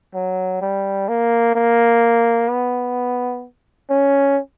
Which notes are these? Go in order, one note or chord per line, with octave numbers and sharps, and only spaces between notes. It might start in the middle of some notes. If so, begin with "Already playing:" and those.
F#3
G3
A#3
A#3
B3
C#4